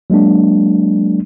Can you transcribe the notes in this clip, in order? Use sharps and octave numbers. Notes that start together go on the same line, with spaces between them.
F#3 G#3 A#3 D4